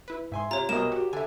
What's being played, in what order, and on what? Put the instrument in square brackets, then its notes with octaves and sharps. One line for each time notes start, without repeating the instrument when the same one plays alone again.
[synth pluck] E4 B4
[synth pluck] G#2 [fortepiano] E5 G#5 C6
[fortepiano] C3 [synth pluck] F4 [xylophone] C#5 A#5
[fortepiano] C2 B2 D#5 [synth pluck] A#4 A#5 [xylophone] E7
[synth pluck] F#4 [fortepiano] G4
[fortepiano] D3 [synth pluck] E5 G#5